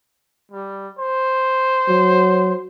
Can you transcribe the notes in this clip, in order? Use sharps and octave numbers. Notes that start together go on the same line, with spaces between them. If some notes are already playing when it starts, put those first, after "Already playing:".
G3
C5
F#3